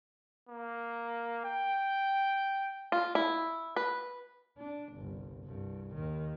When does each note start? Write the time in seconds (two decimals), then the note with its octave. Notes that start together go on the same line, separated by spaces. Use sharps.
0.49 A#3
1.45 G5
2.92 F4
3.15 E4
3.76 B4
4.58 D4
4.93 G1 C2
5.44 C2 G2
5.95 D#2 D#3